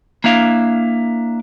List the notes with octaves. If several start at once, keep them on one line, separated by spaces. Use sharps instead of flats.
A#3 D4 E4 F5